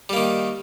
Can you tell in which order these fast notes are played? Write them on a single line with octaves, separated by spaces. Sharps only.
G3 A#3 D#3